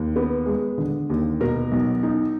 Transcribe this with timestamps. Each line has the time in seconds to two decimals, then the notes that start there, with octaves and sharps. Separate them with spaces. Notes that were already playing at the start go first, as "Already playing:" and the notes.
Already playing: D#2
0.16 B3
0.46 G#3
0.78 D3
1.10 D#2
1.40 B2 A#4
1.72 B1
2.03 D#4